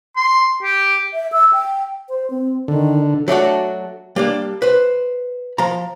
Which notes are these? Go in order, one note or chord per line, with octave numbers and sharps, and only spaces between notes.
C6
G4
E5
E6
G5
C5
C4
D3 D#3
F#3 A3 D4 F#4
G3 A#3 D4
B4 C5
F3 A#5